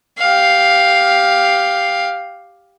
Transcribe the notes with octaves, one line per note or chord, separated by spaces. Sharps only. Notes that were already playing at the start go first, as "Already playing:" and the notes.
G4 F5